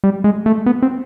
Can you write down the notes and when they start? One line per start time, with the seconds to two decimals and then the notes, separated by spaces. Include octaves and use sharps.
0.04 G3
0.24 G#3
0.46 A3
0.66 B3
0.82 C4